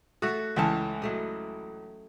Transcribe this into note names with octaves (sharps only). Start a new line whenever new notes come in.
A3 F#4 A4
C#2 E3 C#4 E5 A5
F#3 A3 D#5